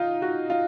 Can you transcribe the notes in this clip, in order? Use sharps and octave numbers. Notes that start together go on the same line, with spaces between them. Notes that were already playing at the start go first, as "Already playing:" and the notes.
Already playing: D#4 F4
F#4
F4